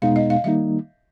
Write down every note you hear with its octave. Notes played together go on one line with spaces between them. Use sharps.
E2 B2 G#3 B3 D#4 F5
D#5
F5
D#3 G3 A#3 D#4 E5